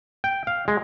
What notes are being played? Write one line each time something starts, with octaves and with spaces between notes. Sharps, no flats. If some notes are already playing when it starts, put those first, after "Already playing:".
G5
F5
G#3